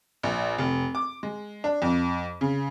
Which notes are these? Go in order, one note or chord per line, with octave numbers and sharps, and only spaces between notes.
A#1
F1
D6
G#3
D4
F2
C#3